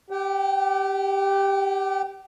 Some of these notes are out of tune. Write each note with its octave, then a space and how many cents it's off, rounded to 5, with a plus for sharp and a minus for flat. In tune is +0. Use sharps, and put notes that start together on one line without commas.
G4 +5 G5 -45